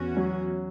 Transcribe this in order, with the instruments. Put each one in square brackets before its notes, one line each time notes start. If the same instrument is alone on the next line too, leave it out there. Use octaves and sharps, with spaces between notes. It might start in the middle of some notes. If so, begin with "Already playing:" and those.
Already playing: [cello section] E2 E3 C#4 F#4
[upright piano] F#3